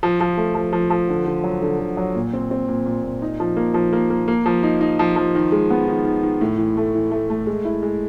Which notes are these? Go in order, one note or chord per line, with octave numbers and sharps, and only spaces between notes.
F3
F3
A3
F3
F3
F3
D3
D3
F#3
D3
D3
F#3
A#2
C4
C4
A#2
A#2
A#2
D#4
F3
A#3
F3
A#3
A#3
A#3
F3
D#4
D#4
F3
F3
D#3
G#3
B3
D#3
D#3
D#3
A2
E3
A3
E3
A3
A3
G#3
E4
G#3